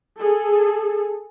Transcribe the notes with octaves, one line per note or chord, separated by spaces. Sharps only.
G#4 A4